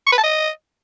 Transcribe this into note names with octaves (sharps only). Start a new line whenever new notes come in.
C#6
B4
A5
D#5